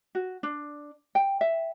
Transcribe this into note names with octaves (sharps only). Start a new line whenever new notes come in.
F#4
D4
G5
E5